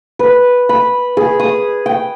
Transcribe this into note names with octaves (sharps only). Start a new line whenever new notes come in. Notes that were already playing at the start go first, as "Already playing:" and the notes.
B4
B5
G#4
D#6
G5